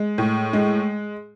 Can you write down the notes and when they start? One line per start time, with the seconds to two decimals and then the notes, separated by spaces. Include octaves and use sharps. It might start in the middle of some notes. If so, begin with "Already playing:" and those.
Already playing: G#3
0.18 A2
0.53 G#3